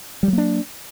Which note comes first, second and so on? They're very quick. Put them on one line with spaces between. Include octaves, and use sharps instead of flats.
G3 F#3 A#3 D4